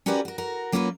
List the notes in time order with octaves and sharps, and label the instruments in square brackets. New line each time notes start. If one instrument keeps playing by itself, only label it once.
[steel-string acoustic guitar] C#4 F#4 G4 A#4 B4 D5
F#4 A#4
F#4 A#4
F#3 A#3 C#4 F4 A4 B4